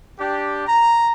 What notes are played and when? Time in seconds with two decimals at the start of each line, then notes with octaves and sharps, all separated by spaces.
0.20 D4 G4
0.67 A#5